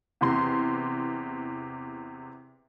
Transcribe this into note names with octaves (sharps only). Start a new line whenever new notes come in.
E2 C3 C6